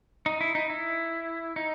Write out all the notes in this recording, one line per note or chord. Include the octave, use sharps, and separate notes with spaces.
D#4
E4
D#4
E4
D#4